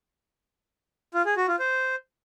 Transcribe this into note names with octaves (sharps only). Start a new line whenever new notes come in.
F4
G#4
F#4
F4
C5